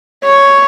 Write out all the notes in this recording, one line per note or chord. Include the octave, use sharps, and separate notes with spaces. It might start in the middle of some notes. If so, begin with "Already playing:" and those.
C#5